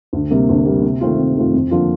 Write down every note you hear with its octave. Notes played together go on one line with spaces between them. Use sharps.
D2
C3 G3 A#3
D2
C3 G3 A#3
C3
D#3 A3 C4 F4
C3
D#3 A3 C4 F4
F2
D3 F3 A#3 F4